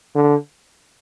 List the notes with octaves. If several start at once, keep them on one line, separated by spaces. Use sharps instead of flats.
D3